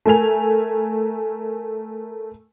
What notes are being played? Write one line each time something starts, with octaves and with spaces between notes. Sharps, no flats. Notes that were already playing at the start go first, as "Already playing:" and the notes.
A3 A#4 G#5 F7